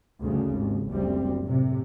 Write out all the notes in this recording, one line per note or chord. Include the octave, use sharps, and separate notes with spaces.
D2 G2 C#3
G#1 D#2
F#1 D2 G3 C4
A2 C3